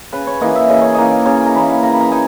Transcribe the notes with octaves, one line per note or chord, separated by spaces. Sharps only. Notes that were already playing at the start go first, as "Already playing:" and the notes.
C#3 B4
C#5
E3 A#3 D#4 D#5
E5
C#3 D#5
C#5
E3 A#3 D#4 D#5
C#3
A#5
E3 A#3 D#4 B5
C#3 A#5
B5
A#5
D#4 G#5